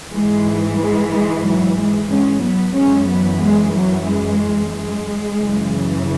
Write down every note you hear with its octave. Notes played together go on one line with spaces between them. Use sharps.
G#2 E3 G#3
G#3
G#3
F#3
G#3
G#3 C#4
F#3 B3
F#2 E3 G#3 C#4
F#3 B3
G#3
F#3
G#3
G#3
F#2 C#3 E3